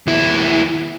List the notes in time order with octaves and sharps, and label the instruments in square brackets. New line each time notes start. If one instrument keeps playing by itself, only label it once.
[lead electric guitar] D#2 E4